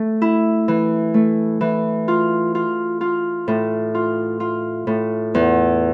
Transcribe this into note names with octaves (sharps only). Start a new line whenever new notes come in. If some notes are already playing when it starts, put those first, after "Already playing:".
Already playing: A3
E4
E3
A3
E3
F4
F4
F4
A2
F4
F4
A2
E2